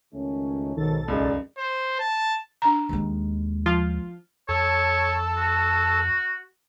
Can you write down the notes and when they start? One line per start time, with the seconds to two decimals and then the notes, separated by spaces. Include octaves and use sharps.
0.13 C#2 D#3 A3 C#4
0.76 B1 G#2 D#3 F#3 A4 A6
1.08 C#2 F#2 G#3 D#4 D5
1.57 C5
1.99 A5
2.62 D4 A#5
2.89 D#2 G#3
3.66 F3 F4
4.49 F2 A4 C#5
5.37 F#4